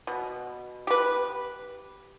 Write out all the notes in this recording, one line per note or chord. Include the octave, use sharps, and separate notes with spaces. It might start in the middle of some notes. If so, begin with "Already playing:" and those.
B2
G4 B4